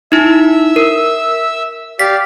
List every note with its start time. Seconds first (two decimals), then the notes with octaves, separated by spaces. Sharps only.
0.12 D#4 E4 E5 E6
0.76 A#4
1.99 G4 D5 F5 B6